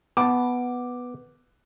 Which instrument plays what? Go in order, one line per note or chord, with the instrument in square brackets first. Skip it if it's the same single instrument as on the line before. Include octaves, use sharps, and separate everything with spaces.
[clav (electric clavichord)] B3 A5 [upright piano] D6